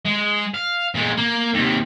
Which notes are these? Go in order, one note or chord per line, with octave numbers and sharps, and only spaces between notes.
G#3
F5
A#2 G#3
A#3
D#2 C3